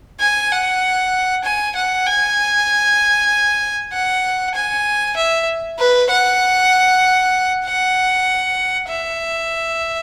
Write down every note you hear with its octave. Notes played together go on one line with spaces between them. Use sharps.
G#5
F#5
G#5
F#5
G#5
F#5
G#5
E5
B4
F#5
F#5
E5